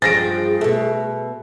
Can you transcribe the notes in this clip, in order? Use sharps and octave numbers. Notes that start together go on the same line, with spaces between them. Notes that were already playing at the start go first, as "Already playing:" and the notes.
G2 F3 G#4 A6 A#6 D7
B2 A3 A4